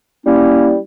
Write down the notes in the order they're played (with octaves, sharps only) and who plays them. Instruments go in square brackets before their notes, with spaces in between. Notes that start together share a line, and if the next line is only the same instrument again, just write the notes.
[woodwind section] G3 A#3 C#4 E4